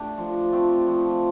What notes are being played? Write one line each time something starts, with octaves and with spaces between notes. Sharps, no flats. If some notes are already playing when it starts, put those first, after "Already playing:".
Already playing: A3 D4 G4
F3
A3 C4 G4
F3